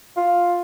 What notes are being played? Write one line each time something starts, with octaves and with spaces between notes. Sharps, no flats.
F4